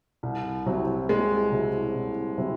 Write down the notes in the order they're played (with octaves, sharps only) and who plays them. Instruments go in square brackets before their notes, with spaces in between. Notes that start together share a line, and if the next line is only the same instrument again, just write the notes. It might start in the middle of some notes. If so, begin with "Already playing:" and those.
[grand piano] C2
C3 F#3 C4 E4
[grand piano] C2 [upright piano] G#3
[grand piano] C3 F#3 C4 E4
C2
C3 F#3 C4 E4